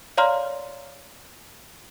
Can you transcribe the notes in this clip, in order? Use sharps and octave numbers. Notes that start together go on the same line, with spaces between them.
C#5 D5 F5 A#5 C6 F6